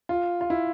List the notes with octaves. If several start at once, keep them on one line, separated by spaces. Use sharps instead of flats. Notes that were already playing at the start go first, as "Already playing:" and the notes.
F4
F4
E4